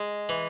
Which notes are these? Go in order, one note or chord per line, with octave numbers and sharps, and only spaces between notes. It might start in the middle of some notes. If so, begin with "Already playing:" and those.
Already playing: G#3
E3